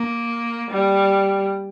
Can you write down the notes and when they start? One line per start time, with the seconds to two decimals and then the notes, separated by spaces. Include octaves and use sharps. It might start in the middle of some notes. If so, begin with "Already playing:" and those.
Already playing: A#3
0.71 G3